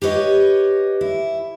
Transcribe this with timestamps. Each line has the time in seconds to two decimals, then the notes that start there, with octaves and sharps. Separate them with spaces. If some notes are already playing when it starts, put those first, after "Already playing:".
0.02 G4 B4 C#5 D#5
1.01 E4